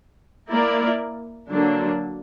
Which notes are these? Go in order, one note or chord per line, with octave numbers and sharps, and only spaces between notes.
A#3 E4 A#4 D5
D3 F#3 A#3 D4